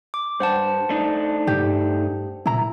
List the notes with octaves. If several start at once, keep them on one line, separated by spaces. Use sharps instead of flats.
D6
G2 C5 F#5 A5
A3 D4 D#4
G2 G4
A#2 E4 A#5